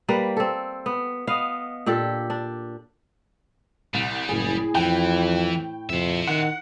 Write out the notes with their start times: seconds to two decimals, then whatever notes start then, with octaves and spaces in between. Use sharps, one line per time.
0.08 G3 A#3 B4
0.37 C4 A4
0.86 B3
1.27 B3 D#5 F5
1.86 A#2 D4 G4 A4
2.30 D4
3.94 C2 G3
4.29 F#1 A2 G#4
4.75 F2 E3 G5
5.89 F2 C5 E5
6.27 D#3 F#5